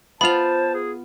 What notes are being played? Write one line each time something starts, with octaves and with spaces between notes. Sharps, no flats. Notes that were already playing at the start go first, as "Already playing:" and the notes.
B3 F4 C5 A5 B5 F7
G#4